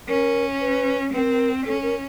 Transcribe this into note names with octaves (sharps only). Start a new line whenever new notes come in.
C#4 A#4
B4
C4 A#4 B4
C#4 A4
A#4